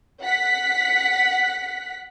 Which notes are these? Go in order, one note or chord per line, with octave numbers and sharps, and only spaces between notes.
F#5 B6